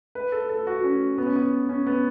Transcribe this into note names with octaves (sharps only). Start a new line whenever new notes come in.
B4
A4
A4
F#4
C#4
B3
C#4
B3
C#4
B3